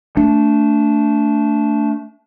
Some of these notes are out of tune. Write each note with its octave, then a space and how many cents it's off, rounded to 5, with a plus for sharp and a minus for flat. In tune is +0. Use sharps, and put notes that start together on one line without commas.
A3 +10 D4 -15